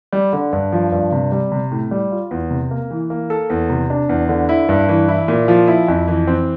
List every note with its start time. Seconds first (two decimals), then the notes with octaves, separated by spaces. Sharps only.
0.13 G3
0.33 D3
0.53 G2
0.72 F3
0.92 G2
1.12 C3
1.32 G3
1.52 C3
1.72 A2
1.91 G3
2.11 F4
2.31 E2
2.51 C3
2.71 A#3
2.91 E3
3.10 A#3
3.30 A4
3.50 E2
3.70 C3
3.90 D4
4.09 E2
4.29 D3
4.49 E4
4.69 G2
4.88 E3
5.08 E4
5.28 A#2
5.48 F3
5.68 E4
5.88 F2
6.08 E3
6.27 C4